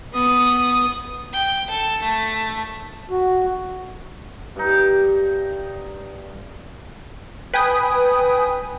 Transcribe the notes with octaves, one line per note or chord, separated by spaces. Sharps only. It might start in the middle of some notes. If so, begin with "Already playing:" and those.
B3 D#6
G5
A4
A3
F#4
G2 D#4
B4 G5 G#5 D#6